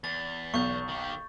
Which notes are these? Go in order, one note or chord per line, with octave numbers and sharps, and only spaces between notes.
E2 A6
B1 C#6 G6
D#3 G4